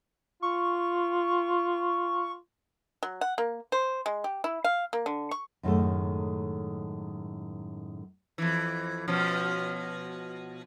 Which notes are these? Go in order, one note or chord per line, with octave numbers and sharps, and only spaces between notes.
F4 C#6
F#3
F#5
A#3
C5
G#3
G4
E4
F5
A#3
D3
C#6
F#2 A2 D#3 F3 G#3 A3
F2 E3
B2 F3 C#4